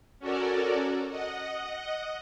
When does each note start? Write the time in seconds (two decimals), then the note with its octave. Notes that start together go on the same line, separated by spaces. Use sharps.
0.19 C#4 F#4 A4 A#4 D5
1.10 D#5 F#5